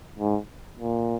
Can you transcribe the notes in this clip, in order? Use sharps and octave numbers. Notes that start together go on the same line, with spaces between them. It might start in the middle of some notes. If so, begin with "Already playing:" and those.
G#2
A#2